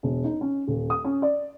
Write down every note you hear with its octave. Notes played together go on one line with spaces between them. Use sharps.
E1
D#4
C#4
D#1
D#6
C#4
D5